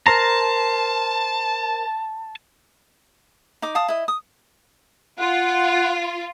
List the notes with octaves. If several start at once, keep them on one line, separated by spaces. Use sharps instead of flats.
A#4 C5 A5 A#5
D#4 D6
F5 A5 D#6
E4 D#5
D#6
F4 F#5